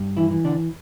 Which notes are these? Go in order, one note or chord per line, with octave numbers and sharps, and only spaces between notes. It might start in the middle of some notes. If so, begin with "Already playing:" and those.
Already playing: G2
E3 E4
E3
D3 D4